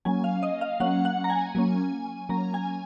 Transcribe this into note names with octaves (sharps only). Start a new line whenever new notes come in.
F#3 A#3 C#4 G#5
F5
D#5
F5
F#3 A#3 C#4 F#5
F#5
A#5
G#5
F#3 A#3 C#4
F#3 A#3 C#4 A#5
G#5